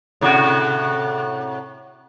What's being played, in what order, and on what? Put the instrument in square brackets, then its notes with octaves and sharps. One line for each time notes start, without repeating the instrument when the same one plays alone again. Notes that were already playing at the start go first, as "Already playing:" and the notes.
[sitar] A2 C3 F#4